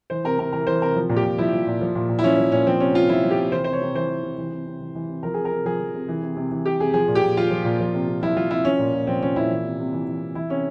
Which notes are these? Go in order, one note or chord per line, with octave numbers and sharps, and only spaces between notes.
E3 C5
C3 A#4
C3 A#4
E3 A#4
E3 C5
C3 A#4
F3
A#2
G4
A#2
F3 E4
F3
A#2
F3
A#2
A#2
E4
F3 C#4
F3
A#2 C#4
F3 C4
C3 C#4
C3 F4
F3 E4
F3
G4
C3
E3 C5
C3 C5
C#5
C3
E3 C5
E3
C3
E3
C3
C3
E3
E3
C3
F3 A#4
C3 G#4
A#4
C3
F3 G#4
F3
C3
E3
C3
C3
E3
E3 G4
C3 G#4
F3 G#4
A#2
G4
A#2
F3 F4
F3
A#2
F3
C3
C3
F3 E4
F3 F4
C3 E4
F3 C#4
A#2
A#2
F3 C4
F3 C#4
A#2 E4
E3
C3
C3
E3
E3
C3
E3 E4
C3 C#4